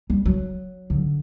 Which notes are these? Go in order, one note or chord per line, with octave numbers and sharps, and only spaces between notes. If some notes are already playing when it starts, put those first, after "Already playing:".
G3
F#3
D3